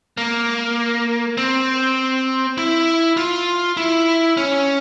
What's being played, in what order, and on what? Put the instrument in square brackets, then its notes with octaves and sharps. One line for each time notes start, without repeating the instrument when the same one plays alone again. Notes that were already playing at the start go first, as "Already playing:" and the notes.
[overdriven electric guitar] A#3
C4
E4
F4
E4
C#4